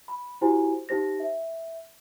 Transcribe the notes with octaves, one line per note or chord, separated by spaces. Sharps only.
B5
E4 F#4 G4 C5 G#5
D#4 G4 C5 A#6
E5